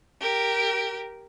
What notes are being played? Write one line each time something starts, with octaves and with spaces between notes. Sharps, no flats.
G4 A#4